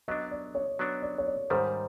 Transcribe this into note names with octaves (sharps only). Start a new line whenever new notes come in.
F#3 B3 D4 D#5
D5
C#5
F#3 B3 D4
D5
C#5
D5
G#2 D#3 G3 C5